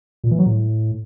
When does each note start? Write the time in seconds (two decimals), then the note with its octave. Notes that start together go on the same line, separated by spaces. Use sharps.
0.24 A#2
0.31 E3
0.39 F#3
0.46 A2